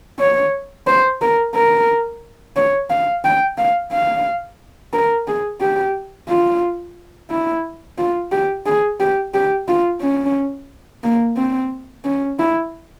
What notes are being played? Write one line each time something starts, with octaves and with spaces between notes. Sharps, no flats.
C#5
C5
A#4
A#4
C#5
F5
G5
F5
F5
A#4
G#4
G4
F4
E4
F4
G4
G#4
G4
G4
F4
C#4
A#3
C4
C#4
E4